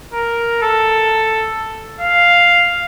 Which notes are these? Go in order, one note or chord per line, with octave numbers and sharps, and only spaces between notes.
A#4
A4
F5